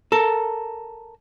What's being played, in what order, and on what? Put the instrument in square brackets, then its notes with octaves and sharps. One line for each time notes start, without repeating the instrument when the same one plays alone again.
[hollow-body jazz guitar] A4 A#4